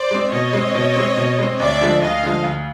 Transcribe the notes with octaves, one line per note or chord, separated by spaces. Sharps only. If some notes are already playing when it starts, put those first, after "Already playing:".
Already playing: C5 D5
G#3 C4
B2 C#5 D#5
G#3 C4
B2
G#3 C4
B2
G#3 C4
D2 D5 E5
D3 F3 G#3
D2 D#5 F5
D3 F3 G#3
D2